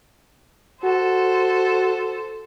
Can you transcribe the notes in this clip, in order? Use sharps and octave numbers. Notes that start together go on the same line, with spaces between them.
F#4 A4 C5